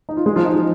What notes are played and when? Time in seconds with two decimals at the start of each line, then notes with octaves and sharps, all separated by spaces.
0.09 D#4
0.17 F4
0.26 G#3 G#4
0.36 F3 F4
0.45 D#4
0.54 F4